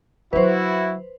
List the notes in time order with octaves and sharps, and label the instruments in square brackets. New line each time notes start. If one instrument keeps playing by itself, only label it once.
[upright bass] D3 F#3 [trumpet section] E4 F#4 [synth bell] B4 C5